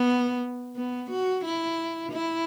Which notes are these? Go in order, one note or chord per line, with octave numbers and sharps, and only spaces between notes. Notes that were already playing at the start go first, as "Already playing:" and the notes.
Already playing: B3
B3
F#4
E4
E4